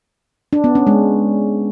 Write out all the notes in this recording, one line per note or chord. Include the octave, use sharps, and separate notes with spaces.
D4
B3
C#4
G#3